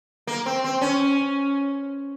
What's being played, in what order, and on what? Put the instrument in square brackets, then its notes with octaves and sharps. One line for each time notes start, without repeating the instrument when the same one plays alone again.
[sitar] A#3
C4
C4
C#4